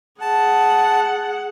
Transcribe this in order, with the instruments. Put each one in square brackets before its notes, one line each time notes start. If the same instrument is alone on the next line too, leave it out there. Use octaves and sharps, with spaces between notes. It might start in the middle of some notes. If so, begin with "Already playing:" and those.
[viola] G#4 F#5 [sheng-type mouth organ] A5